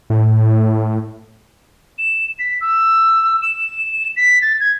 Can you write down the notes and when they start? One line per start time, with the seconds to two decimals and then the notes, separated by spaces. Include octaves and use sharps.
0.10 A2
1.98 E7
2.39 B6
2.61 E6
3.42 E7
4.16 B6
4.42 A6
4.61 G#6